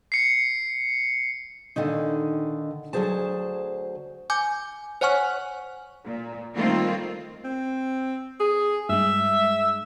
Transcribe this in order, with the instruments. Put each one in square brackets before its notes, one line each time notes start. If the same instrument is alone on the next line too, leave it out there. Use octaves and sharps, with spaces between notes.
[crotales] C7 C#7
[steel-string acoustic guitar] A#2 D3 D#3 D#4
D2 C3 F#3 G#4 C5 A5
[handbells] G#5 D6 G6
C5 C#5 F#5 G#5 C#6 F6
[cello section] A#2
D#3 G3 A3 A#3 C4 F4
[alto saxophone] C4
G#4
[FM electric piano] G2 G#3 [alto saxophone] E5